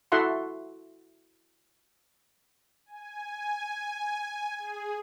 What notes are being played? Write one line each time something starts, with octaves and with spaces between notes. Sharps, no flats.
E4 F#4 A4 E5 F#5 C6
G#5
G#4